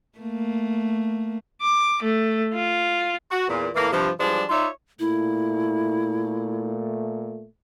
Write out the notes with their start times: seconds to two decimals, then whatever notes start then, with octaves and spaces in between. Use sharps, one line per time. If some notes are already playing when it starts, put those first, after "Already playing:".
0.19 A3 A#3
1.61 D6
2.03 A3
2.53 F4
3.31 F#4
3.48 E2 A#2
3.75 A2 E3 A#3
3.92 G2 C3 F3
4.19 E3 F3 G3 G#3 D4
4.50 D#4 F4 C#5 D5 E5
4.99 A#2 A3 E4